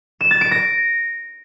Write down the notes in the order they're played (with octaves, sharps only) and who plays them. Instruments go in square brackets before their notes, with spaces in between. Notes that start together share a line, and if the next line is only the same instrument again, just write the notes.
[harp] E7
A6
D7
A#6